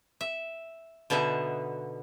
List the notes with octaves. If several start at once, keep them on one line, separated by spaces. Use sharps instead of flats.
E5
B2 D3 B3 D#4 E5